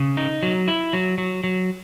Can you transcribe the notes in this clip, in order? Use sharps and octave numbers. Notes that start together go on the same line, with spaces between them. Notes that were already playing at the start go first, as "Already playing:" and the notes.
Already playing: C#3
D#4
F#3
E4
F#3
F#3
F#3